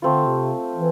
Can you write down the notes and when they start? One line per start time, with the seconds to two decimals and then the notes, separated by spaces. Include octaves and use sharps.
0.02 D3 A3 C4 F4
0.27 C3
0.76 E3